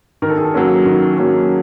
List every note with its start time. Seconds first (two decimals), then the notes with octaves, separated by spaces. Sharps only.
0.22 D#3 A#4
0.30 A4
0.37 G#4
0.45 A4
0.54 F#3 A#3 C#4
0.86 D#3
1.18 F#3 A#3 C#4